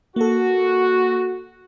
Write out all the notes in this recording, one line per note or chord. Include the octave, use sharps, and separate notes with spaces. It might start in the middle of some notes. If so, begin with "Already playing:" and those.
A#3 F#4 A4